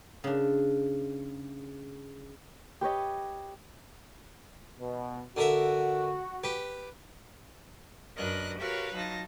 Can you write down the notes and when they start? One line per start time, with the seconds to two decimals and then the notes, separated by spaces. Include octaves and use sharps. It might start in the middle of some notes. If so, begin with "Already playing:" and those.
0.24 C#3 D4
2.81 G4 B4 C#5 D#5
4.80 B2
5.37 D3 F#4 A#4 E5
6.44 G4 B4
8.16 F#2 D4 A#4 B4 D#5 F#6
8.58 F#4 G4 A#4 B4 C#5 F5
8.94 F#3 D#4 F4 A5 A#6